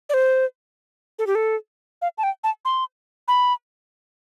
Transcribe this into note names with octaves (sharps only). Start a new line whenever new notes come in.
D5
C5
A4
G4
A4
F5
A5
G5
A5
C6
B5